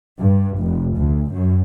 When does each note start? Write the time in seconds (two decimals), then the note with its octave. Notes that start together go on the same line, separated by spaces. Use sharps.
0.21 G2
0.60 F1
0.97 D2
1.33 F#2